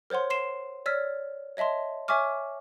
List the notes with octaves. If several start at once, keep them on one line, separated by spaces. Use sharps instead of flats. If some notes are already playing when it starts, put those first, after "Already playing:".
A#4 C5 C#5 F#5 C6
C6 C7 E7
C#5 D5 E6 F6 B6
C#5 D#5 E5 A5 C6
C#5 E5 G#5 C#6 D6 F6